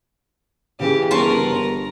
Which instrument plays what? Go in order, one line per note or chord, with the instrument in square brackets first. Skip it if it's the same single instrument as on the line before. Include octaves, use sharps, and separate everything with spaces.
[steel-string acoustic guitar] C#3 E3 G#4 [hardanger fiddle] G4
[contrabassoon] G1 [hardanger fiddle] A#4 B4 [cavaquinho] A5 C6 C#6
[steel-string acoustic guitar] A#4 [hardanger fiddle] A#5